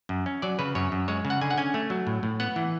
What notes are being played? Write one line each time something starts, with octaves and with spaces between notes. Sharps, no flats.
F#2
C#4
F#3 D5
C#3 B4
F#2 C#5
F#2
G#3 C#5
C#3
F#5
D3 G#5
F#5
C#4 G#5
A3
F#3
A2
A2
B3 F#5
E3